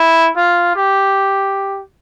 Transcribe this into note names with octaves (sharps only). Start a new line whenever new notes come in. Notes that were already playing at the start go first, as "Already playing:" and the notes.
Already playing: E4
F4
G4